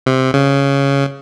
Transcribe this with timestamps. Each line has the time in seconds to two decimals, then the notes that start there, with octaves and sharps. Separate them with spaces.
0.06 C3
0.34 C#3